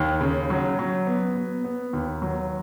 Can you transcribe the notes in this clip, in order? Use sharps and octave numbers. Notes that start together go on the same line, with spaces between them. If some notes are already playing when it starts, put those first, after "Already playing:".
Already playing: D#2
C#3
F#3
F#3
B3
B3
B3
D#2
F#3